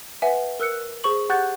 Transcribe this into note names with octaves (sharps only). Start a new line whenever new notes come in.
B4 E5 F#5 G#5
A#4 E6 F#6 C#7
G#4 C5 C#6 F#7
G4 F#5 C#6 F#6 G6 A6